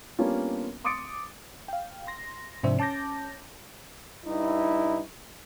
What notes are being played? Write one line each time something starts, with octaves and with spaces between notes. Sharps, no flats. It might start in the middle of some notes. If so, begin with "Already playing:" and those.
G3 A#3 B3 C#4 D4 F4
C6 D6 D#6 A6 C#7 D7
F5 G5
C6 A#6
G#2 C3 F3 D4 C5 E5
C#4 A5 D6 G6 A#6
G2 D#4 E4